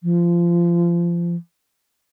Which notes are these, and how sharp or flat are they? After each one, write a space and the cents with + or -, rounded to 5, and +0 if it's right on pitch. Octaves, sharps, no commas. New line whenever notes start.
F3 -25